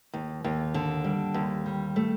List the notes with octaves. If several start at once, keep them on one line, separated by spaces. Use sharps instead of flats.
D#2
D#2
D3
G3
D#2
G3
A3